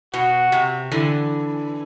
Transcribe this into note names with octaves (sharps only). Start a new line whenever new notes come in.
B2 F#4
C3
D3 E3